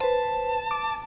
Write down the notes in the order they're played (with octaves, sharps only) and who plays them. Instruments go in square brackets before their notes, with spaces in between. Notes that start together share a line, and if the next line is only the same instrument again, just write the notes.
[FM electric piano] B4 C5 [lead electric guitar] A5
[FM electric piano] D6